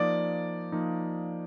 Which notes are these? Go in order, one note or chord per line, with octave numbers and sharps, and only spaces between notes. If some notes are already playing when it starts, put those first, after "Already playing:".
Already playing: F3 A#3 D#4 D5
F3 A#3 D#4